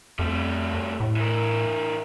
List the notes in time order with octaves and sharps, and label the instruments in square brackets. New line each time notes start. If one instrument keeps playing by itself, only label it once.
[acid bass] F2 [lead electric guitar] G3 A3
[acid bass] A2
[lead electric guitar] E3 A#4